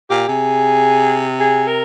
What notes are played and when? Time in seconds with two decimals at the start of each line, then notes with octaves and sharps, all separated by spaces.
0.10 A#2 G4
0.28 C3 G#4
1.39 G#4
1.67 A#4